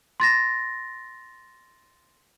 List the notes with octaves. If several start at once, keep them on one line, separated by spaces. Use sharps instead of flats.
C6 A6 A#6